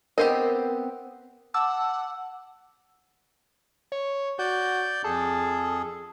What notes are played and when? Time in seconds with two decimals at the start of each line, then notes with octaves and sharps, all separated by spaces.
0.18 B3 C4 G4 A#4 C5 D#5
1.54 F#5 A5 D6 E6
3.92 C#5
4.39 F#4 D5 G6
5.04 F2 G#4 A4